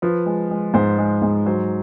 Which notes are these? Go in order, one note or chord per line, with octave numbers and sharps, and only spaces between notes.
F3 B4
G#3
G#3
G#2 C5
G#3
G#2
F#3 C5